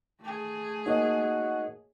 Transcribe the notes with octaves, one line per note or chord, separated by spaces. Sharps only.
A3 G#4
A#3 D#4 F#4 C#5 D#5